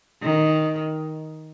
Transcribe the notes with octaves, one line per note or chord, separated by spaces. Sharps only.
D#3